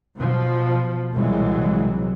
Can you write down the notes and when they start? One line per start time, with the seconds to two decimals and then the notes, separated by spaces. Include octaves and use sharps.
0.16 B2 F3
1.14 C2 A#2 E3 F#3 G#3